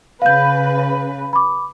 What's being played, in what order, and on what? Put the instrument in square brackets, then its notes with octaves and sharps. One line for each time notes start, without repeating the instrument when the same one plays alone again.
[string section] C#3 B4 [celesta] F5 G6
[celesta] B5 D6